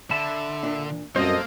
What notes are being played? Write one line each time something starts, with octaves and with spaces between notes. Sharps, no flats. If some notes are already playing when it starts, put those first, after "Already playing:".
D3 E5 A5 B5
A#2 D4
F#2 A#2 G3 A#3 C4 A4 C5 D#5